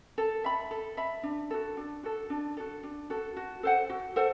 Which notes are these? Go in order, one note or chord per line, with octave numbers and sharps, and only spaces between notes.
A4
E5 B5
A4
E5 B5
D4
F#4 A4
D4
F#4 A4
D4
F#4 A4
D4
F#4 A4
F#4
A4 C5 F#5
F#4
A4 C5 F#5